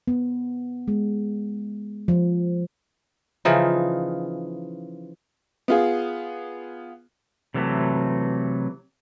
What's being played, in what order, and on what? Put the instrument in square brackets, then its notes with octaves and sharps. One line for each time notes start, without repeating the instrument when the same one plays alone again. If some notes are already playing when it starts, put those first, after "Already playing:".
[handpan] B3
G#3
F3
[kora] C#3 E3 F3 D#4
[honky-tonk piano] B3 F4 G#4
[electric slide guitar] C3 E3 F#3 A3